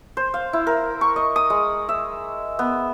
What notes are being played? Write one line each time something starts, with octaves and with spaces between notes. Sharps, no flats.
C5
F5
E4
A#4
C#6
D#5
D#6
G#3
E5
B3